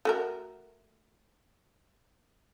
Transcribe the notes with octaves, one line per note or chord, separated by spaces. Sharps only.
A3 F#4 A#4